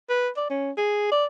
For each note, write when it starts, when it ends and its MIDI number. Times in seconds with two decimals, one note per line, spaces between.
0.09 0.29 71
0.37 0.49 74
0.50 0.71 61
0.77 1.11 68
1.12 1.25 74